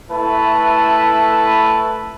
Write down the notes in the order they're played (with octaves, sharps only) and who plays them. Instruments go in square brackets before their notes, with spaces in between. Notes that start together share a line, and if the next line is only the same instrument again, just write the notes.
[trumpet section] A3 E4 B4 A5